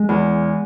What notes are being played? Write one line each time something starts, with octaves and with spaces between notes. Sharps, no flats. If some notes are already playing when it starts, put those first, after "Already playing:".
Already playing: G#3
E2